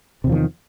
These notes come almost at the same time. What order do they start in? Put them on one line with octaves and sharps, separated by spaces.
C3 E2 F3 D#3